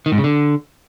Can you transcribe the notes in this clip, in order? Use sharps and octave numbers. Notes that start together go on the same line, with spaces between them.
D#3
G#2
C#3
D3